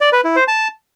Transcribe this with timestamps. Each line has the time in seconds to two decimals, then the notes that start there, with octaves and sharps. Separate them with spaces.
0.01 D5
0.13 B4
0.24 E4
0.36 C5
0.48 A5